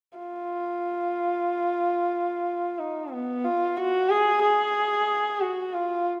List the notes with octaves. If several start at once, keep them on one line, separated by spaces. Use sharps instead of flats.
F4
D#4
B3
F4
F#4
G#4
G#4
F#4
F4